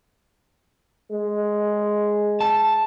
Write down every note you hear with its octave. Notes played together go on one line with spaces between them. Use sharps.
G#3
A5